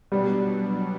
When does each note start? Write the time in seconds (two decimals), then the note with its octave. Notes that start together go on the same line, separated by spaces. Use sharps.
0.12 B2 F#3 G3 B3 D4